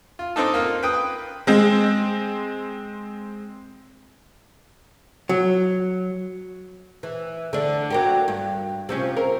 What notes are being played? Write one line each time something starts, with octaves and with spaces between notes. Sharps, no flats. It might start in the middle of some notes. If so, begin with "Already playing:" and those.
F4
C4 D4 D#4 A4
A#3 F4
B4 G5 D#6
G#3 C4
F#3
E3
D3 D4
F#3 A#3 G4
G2
C3 F3 C#4
A#4